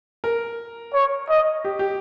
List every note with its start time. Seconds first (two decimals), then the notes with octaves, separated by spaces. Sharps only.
0.24 A#4
0.94 C#5
1.30 D#5
1.65 G4
1.79 G4